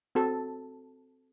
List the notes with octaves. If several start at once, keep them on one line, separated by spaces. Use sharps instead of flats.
C4 F#4 A4